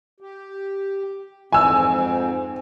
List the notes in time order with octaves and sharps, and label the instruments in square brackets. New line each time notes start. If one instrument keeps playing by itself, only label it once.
[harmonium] G4
[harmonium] F2 G#2 C4 [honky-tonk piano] G#5 E6